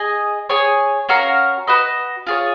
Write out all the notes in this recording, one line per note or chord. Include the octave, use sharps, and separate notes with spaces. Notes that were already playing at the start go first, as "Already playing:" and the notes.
Already playing: G#4 D#5 G#5
G#4 C#5 G#5
C#4 F#4 A#4 F5
F#4 B4 D#5
F4 G#4 C#5